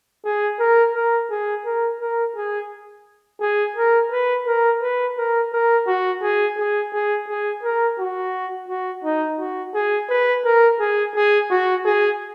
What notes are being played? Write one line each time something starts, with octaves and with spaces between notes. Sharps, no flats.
G#4
A#4
A#4
G#4
A#4
A#4
G#4
G#4
A#4
B4
A#4
B4
A#4
A#4
F#4
G#4
G#4
G#4
G#4
A#4
F#4
F#4
D#4
F#4
G#4
B4
A#4
G#4
G#4
F#4
G#4